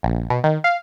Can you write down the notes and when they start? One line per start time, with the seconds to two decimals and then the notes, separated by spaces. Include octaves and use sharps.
0.03 A#1
0.30 B2
0.44 D#3
0.64 F5